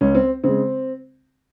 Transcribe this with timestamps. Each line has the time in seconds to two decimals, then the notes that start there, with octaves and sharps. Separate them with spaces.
0.01 C#2 C#4
0.15 C4
0.44 C#3 G#3 C4